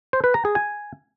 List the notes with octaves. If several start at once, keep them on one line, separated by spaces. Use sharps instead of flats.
C5
B4
A#5
G#4
G#5